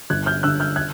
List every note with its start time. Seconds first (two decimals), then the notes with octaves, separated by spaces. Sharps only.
0.10 G1 F#6 G#6
0.26 F6 G6
0.43 D3 E6 F#6
0.60 F6 G6
0.76 F#6 G#6